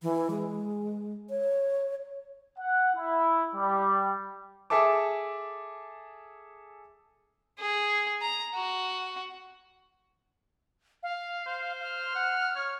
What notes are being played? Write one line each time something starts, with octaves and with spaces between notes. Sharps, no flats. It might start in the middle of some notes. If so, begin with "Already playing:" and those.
E3
G#3
C#5
F#5
E4
G3
G#4 A4 E5 A5 D6
G#4
A#5
F#4
F5
C5
F6
F#5
C#5